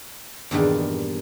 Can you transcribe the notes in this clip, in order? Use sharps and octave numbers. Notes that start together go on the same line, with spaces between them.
E2 G2 A#2 D#3 G3